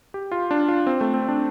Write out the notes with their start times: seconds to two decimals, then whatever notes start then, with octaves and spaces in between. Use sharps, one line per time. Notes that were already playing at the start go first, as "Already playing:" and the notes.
0.14 G4
0.32 F4
0.51 D4
0.68 F4
0.87 C4
1.01 A3
1.14 C4
1.28 D4